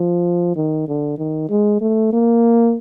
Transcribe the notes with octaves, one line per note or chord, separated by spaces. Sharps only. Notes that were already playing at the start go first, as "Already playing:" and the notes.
Already playing: F3
D#3
D3
D#3
G#3
A3
A#3